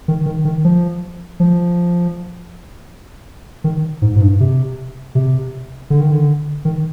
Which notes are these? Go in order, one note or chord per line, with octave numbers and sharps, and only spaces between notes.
D#3
D#3
D#3
F3
F3
D#3
G#2
G#2
G2
C3
C3
D3
D#3
D3
D#3